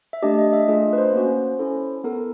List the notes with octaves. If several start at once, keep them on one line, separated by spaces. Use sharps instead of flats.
E5
A3 D4 G4 D#5
D#5
E5
A3 D4 F4 G#4 D#5
B4
C5
A#3 C#4 F#4
C#4 E4 A4
B3 E4 A4 A#4